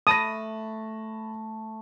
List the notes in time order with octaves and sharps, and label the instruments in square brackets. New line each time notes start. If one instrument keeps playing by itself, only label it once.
[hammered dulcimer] A3 [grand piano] A5 B5 A#6 [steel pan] D#6